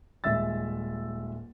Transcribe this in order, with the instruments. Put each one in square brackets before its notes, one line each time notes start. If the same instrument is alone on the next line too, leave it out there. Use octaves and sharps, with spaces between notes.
[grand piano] D#1 G#3 E5 E6 A6